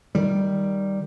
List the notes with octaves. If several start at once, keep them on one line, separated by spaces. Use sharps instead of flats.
D#3 G3